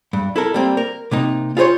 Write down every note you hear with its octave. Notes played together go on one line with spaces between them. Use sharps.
G2
E4 A4 A#4
G3 A#3 C4
A#4
C3 A#3 D#4
F4 G#4 A#4 C5 C#5